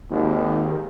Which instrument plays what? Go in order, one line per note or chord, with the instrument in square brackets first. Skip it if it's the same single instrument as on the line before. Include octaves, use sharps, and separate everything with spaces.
[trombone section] G#1 D#2 [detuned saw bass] D#3